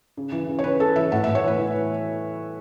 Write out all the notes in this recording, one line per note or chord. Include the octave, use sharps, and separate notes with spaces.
C#3
E3
C#3
C#5
C#3 B4
C#3 A4
E3 E5
A2 F#5
E5
A2
C#5
E3 B4
E3